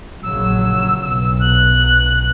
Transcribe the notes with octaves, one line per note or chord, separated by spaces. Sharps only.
A#1 C#3 F#3 E6
B1 E6
F#6